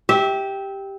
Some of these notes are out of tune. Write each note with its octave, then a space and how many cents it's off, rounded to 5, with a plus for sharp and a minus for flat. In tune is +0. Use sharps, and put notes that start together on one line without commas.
G4 +0 E5 -25